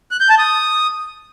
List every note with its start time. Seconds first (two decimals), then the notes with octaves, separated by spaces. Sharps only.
0.11 F#6
0.20 G6
0.29 A5
0.38 D#6